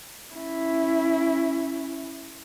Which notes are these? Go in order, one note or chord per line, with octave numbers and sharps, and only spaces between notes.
C#4 E4